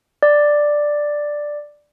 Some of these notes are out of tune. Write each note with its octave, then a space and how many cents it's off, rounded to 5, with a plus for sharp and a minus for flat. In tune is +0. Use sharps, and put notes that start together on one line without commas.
D5 +5